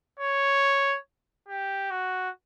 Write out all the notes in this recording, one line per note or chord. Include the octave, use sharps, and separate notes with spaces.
C#5
G4
F#4